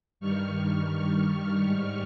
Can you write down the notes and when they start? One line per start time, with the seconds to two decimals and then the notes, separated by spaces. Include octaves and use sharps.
0.20 G2 D#3 G3 C#6 F6
0.91 C#6 F6
1.62 G#2 G3